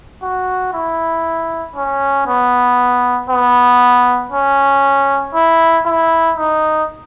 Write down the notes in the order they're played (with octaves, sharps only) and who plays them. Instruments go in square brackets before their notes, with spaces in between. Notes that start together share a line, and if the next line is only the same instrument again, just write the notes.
[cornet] F#4
E4
C#4
B3
B3
C#4
E4
E4
D#4